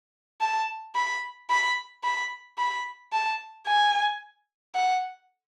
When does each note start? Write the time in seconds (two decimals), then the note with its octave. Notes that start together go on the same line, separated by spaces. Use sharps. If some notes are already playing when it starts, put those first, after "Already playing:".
0.41 A5
0.96 B5
1.50 B5
2.04 B5
2.58 B5
3.13 A5
3.66 G#5
4.75 F#5